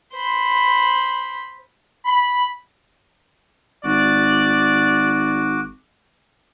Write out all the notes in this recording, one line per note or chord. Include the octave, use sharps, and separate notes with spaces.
C5 B5
B5
G#1 F#4 D5 D6